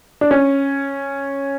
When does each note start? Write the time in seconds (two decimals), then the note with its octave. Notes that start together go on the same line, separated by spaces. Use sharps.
0.21 D4
0.31 C#4